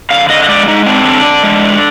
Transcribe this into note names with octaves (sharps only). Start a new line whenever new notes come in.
D3 F5
D3 D#5
D#5
G#3 D5
G#3 D#4
C4 D4
D3
D3
G#3
D3